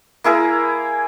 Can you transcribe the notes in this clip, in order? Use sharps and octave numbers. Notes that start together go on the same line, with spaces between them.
A#3 E4 G#4 A#4